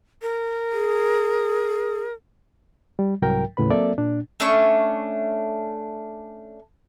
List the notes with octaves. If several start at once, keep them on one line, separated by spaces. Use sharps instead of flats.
A#4
G#4
G3
C2 G#2 F#3 A#4 G5
D#2 A2 C#3 B4 B5
F#3 A#3 C4 A4 D5 E5
A#2 D4
A3 C#4 D4 C#6